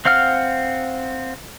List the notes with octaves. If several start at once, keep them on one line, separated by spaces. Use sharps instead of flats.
C4 F5 F#5 F6